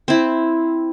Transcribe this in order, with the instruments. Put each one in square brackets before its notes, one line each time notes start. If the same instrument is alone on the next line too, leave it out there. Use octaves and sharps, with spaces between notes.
[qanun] C4 E4